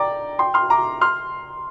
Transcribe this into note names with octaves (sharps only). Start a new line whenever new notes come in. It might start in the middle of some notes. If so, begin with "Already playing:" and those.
Already playing: D5 G5 A#5 D6
G5 C6
C6 F6
A#5 D6
C6 F6